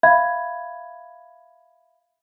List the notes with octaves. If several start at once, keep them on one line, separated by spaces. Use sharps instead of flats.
E5 F5 B5 G#6